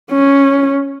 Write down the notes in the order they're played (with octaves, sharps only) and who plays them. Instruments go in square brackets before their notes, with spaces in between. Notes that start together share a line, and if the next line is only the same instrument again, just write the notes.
[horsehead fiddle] C#4